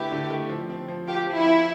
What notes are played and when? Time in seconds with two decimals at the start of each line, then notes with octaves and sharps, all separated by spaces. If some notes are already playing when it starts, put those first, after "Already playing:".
Already playing: D3 A3 E4 G4 B4
0.12 D3
0.30 A3
0.49 F3
0.70 C4
0.88 F3
1.07 F4 G4
1.27 F3
1.36 E4
1.46 C4